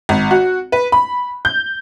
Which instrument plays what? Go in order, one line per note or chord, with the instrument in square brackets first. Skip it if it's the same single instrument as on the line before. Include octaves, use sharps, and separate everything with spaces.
[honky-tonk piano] G#1
F#4
B4
B5
G6